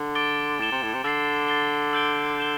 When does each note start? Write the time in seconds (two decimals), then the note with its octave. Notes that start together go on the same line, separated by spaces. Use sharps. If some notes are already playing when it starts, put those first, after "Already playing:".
Already playing: D3
0.15 D6 A6 D7 G7
0.60 A2 A6 E7 G7
0.72 C3
0.83 A2
0.94 C3
1.04 D3 E6 A6 C7
1.48 A6 C7 G7
1.93 E6 G6 D7 G7
2.38 G6 E7 G7